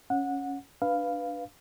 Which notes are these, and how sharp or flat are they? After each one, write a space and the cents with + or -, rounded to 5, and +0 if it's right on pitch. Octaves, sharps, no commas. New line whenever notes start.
C#4 +0 F#5 -20
D4 +0 B4 +0 F5 +0